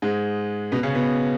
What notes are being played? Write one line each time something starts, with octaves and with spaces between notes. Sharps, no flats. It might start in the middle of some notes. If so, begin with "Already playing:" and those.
G#2 G#3
B2 B3
C#3 C#4
B2 B3